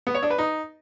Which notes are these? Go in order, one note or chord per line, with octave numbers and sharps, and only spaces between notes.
B3
C#5
D4
B4
D#4